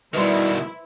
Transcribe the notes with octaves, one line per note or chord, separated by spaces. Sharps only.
B2 D#3 G3 E4 B4 C5 C6